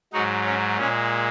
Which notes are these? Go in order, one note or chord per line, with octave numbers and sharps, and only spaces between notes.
G#2 F#3 D#4 F#4
C#4
A#2 G#3 C#4